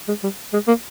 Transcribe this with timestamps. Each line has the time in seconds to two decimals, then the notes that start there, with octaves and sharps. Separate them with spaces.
0.08 G#3
0.23 G3
0.53 G#3
0.67 A#3